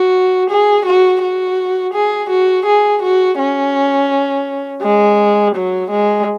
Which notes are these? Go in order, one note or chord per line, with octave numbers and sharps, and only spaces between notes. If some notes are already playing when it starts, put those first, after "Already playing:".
Already playing: F#4
G#4
F#4
F#4
G#4
F#4
G#4
F#4
C#4
G#3
F#3
G#3